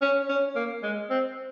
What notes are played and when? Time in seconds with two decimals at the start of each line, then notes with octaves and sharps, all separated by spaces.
0.02 C#4
0.29 C#4
0.56 A#3
0.83 G#3
1.10 C4